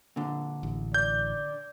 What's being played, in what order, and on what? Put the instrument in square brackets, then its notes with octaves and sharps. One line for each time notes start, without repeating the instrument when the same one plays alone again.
[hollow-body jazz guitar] A#2 D3
[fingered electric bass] A1
[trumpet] D5 [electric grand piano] G6